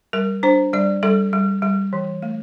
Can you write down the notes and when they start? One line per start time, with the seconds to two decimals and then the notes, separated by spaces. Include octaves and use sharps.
0.13 G3 A#4
0.43 D4 C5
0.73 G3 D5
1.03 G3 A4
1.33 G3
1.62 G3
1.93 E3
2.22 A3